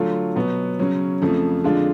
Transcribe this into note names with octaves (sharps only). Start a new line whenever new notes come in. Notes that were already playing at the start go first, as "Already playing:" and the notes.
Already playing: D3 F#3 A3 F4
B2 F#3 B3
C#3 F#3 C#4
F2 C#3 F3 A3
F2 D3 G#3 D4 F4